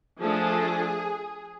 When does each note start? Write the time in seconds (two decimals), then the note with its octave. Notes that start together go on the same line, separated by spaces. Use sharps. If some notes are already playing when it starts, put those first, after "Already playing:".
0.19 F3 A3 D4 G#4